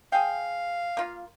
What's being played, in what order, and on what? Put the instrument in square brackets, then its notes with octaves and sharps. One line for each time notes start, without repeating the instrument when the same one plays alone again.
[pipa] G#4 G5 [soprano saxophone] F5
[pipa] A#3 F4